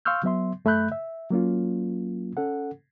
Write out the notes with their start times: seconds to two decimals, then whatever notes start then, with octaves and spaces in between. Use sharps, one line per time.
0.05 F5 C6 C#6 E6 F6 G6
0.23 F#3 B3 E5 C6
0.65 F#2 A3 E5 B5 F#6 G6
0.92 E5
1.31 F#3 A#3 C#4 F4
2.37 C#4 A4 F#5